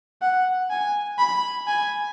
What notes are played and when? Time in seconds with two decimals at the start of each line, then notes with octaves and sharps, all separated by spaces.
0.22 F#5
0.70 G#5
1.18 B5
1.67 G#5